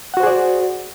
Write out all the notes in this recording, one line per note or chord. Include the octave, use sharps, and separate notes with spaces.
F#4 G#4 C5 D5 F#5